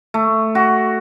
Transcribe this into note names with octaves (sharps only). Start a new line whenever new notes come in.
A3
F#4